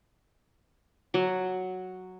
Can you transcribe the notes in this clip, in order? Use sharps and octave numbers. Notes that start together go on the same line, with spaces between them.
F#3